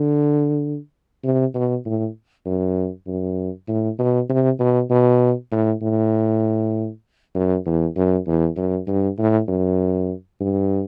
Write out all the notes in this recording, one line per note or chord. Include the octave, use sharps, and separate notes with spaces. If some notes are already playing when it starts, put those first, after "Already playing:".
Already playing: D3
C3
B2
A2
F#2
F#2
A2
B2
C3
B2
B2
A2
A2
F#2
E2
F#2
E2
F#2
G2
A2
F#2
G2